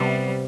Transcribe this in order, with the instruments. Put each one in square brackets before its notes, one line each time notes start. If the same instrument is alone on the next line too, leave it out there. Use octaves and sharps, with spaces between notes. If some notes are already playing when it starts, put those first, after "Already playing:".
Already playing: [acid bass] C3 [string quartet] G3 B3